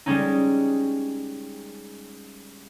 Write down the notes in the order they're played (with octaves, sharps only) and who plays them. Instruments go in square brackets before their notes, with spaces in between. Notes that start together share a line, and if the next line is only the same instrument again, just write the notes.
[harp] G3 G#3 C#4 D#4